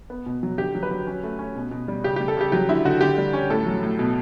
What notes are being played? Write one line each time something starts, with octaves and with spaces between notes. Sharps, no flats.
B3
B2
F#3
D3 G4
F#3
B4
F#3
C#4
A3
C#4
B2
B2
G3
C#3 G4
G3 G4
A4
C#3 G4
F#3 G4
D3 E4
D3 F#4
D3 G4
G3
C#4
A2 A4
F#3
A2
B2